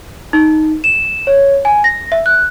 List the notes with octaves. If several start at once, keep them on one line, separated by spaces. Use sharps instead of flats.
D#4
E7
C#5
G#5
A#6
E5
F#6